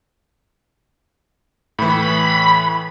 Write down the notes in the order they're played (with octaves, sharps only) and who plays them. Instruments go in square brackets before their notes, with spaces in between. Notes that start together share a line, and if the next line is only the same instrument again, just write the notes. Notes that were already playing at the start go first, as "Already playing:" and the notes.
[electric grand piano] A2 E3 [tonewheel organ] B5